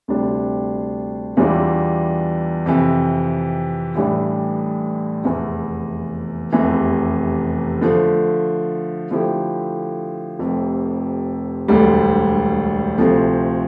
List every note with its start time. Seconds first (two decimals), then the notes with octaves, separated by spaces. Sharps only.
0.08 D2 C3 G3 D4
1.37 E2 E3 G3 D4 F4
2.66 F2 C3 E3
3.95 A1 A2 E3 G3 D4
5.24 F1 E2 E3
6.53 F1 E2 C3 E3
7.81 D3 F3 A3
9.11 D3 F3 A3 E4 G4
10.39 F1 F2 C3
11.68 E1 D2 D3 G3
12.98 D2 C3 F3 A3